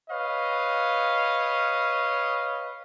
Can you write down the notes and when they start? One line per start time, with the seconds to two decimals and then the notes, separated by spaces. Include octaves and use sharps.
0.10 B4 C#5 D#5 F5